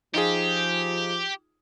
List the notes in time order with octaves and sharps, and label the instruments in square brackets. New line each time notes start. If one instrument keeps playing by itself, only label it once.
[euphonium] F3 [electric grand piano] D#4 F4 G#4 [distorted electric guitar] G4